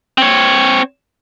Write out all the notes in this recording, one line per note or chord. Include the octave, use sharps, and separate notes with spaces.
C4 C#5